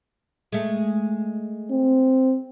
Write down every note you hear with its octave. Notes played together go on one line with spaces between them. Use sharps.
G#3 A3
C4